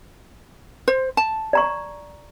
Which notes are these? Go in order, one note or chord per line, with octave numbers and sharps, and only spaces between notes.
C5
A5
D5 A#5 C#6